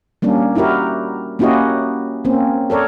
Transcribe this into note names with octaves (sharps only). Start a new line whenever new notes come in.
G3 A#3 C#4 D4
D#4 E4 F#4 G4 A#4
A#3 C#4 E4 F#4 G4 D#5
A#3 C4 C#4
A4 A#4 C#5 D5